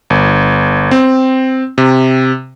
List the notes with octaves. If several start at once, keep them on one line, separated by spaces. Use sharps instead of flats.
G1
C4
C3